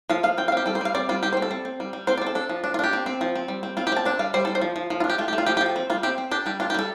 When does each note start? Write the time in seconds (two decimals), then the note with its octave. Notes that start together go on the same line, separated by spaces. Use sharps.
0.10 F3 F5
0.23 F3 F5
0.37 C4 G5
0.48 F5
0.52 C4 G4
0.66 G3 A4
0.75 C5
0.81 G3 F5
0.95 C4 D5
1.09 G3 F4
1.23 G3 G4
1.33 C5
1.37 C4
1.42 A4
1.51 C4
1.65 C4
1.80 G3
1.93 G3
2.07 C4 C5
2.18 D5
2.22 C4 A4
2.35 D4 A4
2.49 F3
2.64 D4
2.74 F4
2.79 D4 G4
2.93 C4
3.06 C4
3.21 F3
3.35 C4
3.48 G3
3.63 C4
3.77 C4 F4
3.87 G4
3.92 C4 A5
4.05 D4 A5
4.19 G3 F5
4.34 G3 C5
4.45 G3 A4
4.55 C5
4.61 F3
4.76 F3
4.90 F3
5.00 F4
5.04 D4
5.10 G4
5.18 A3 F4
5.28 G4
5.33 A3
5.38 F4
5.46 F3 G4
5.57 G4
5.61 F3
5.66 A4
5.76 C4
5.90 G3 F4
6.03 C4 G4
6.18 C4
6.31 D4 G4
6.46 G3 G4
6.60 D4 F4
6.70 G4
6.74 G3 A4